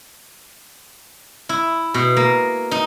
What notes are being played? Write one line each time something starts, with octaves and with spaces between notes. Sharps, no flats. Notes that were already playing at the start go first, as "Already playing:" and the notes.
E4
B2
A#3
D#4